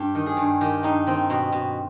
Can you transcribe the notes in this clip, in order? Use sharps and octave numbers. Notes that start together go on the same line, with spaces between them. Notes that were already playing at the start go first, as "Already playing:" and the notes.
Already playing: G2 G4
D#3
G#4
G2
D#3 G4
G2 D#4
D#3 C4
B2
B2